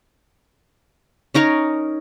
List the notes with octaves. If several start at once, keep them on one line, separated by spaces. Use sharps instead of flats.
C#4 D#4 A#4 C#5